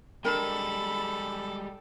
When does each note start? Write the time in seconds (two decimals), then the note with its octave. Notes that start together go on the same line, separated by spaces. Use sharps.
0.24 G3 G#3 D4 A4 A#4 G5 B5